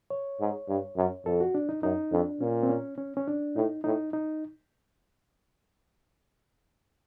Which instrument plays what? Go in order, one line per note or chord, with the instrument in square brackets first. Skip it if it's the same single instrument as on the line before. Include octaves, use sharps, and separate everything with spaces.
[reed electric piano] C#5
[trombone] G#2
G2
F#2
[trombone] F2 [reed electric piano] A4
[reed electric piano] F#4
D4
D#4
[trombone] F#2 [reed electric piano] D#4
[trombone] F2 [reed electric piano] D4
[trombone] A#2 [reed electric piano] C#4
[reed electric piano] C4
C#4
C#4
C#4
D4
[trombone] A2 [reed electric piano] D#4
[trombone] A2 [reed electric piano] D#4
[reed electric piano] D#4